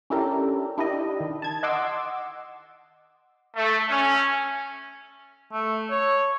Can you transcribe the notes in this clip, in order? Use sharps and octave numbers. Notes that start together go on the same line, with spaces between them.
C#4 D4 E4 G4 A4 A#4
D4 E4 G4 D#5
D#3
A5 G#6
D#5 F#5 C6 D6 E6
A3
C#4
A3
C#5